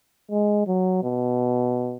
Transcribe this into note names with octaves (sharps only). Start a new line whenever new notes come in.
G#3
F#3
B2